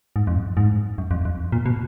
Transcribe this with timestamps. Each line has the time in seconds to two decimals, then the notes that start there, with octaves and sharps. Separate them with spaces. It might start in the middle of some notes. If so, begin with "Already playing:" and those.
0.16 G#2
0.27 F2
0.36 F#2
0.57 G#2
0.98 F#2
1.11 F2
1.25 F2
1.52 A#2
1.66 B2